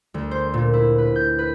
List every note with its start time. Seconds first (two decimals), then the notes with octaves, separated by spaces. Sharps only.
0.14 D2
0.31 C5
0.54 A#2
0.74 E4
0.98 B4
1.16 G6
1.39 B4